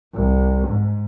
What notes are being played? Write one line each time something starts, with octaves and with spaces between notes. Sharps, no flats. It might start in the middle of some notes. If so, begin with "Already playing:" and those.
C2
G#2